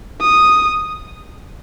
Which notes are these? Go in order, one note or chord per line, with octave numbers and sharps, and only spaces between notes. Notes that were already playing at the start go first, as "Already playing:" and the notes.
D#6